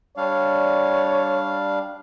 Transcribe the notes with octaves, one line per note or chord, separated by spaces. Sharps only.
G3 D4 C#5 F5